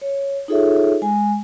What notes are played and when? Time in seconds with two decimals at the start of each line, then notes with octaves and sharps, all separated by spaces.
0.02 C#5
0.48 D#4 F4 G#4 A4 C#5 E5
1.02 G#3 G#5